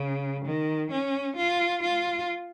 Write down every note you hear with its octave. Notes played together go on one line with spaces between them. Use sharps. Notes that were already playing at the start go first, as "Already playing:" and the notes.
Already playing: C#3
D#3
C#4
F4
F4